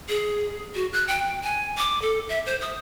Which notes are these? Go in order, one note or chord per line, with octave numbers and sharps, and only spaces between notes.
G#4
F#4
F#6
G5
G#5
D6
A4
E5
C5
D#6